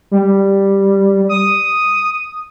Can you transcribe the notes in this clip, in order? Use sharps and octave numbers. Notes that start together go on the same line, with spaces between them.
G3
D#6